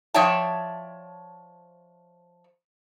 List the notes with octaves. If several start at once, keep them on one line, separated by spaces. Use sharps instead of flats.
F3 C#5 D5 E5 G5 A5